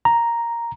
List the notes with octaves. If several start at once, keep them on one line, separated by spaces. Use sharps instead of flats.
A#5